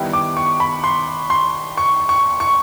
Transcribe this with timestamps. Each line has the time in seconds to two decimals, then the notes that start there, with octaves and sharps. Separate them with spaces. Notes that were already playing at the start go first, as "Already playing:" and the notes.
Already playing: D#3 G3 B3 E4
0.13 D6
0.37 C#6
0.60 B5
0.84 C6
1.30 C6
1.77 C#6
2.09 C#6
2.40 C#6